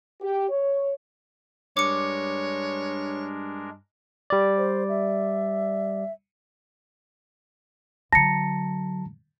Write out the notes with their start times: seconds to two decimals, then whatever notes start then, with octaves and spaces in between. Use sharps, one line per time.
0.21 G4
0.50 C#5
1.77 G2 G#3 D4 A#4 C#5 D6 C#7
4.30 G3 D5
4.57 C5
4.89 E5
8.12 D3 F#3 A5 A#5 A#6 C#7